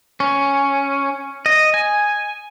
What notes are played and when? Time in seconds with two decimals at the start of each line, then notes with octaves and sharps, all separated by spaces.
0.20 C#4
1.46 D#5
1.74 G#5